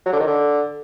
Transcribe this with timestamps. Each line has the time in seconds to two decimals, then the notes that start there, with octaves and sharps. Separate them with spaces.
0.05 F#3
0.13 D3
0.20 D#3
0.27 D3